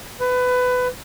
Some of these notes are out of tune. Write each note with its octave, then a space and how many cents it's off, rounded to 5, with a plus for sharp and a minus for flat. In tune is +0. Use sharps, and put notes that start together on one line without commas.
B4 +20